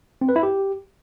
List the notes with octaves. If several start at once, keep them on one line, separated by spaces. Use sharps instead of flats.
C4
B4
E4
G4